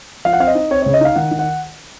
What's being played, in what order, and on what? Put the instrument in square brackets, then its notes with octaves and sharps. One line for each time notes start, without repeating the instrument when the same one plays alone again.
[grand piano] F3 F5
F#5
C4 F5
D#5
D#4
C4 C#5
C#3 C#5
D#5
D#4 F5
D#3 F#5
D#3
F#5